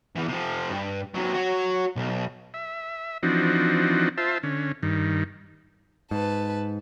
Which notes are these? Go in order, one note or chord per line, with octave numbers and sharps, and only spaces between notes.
E2 E3
C3 F3
G2
C3 F#3
F#4 C#5
B1
E5
E3 F3 C4 D4 D#4 F#4
F4 C5 E5 A5
D3 C#4
G2 D#3
G#2 B4 A5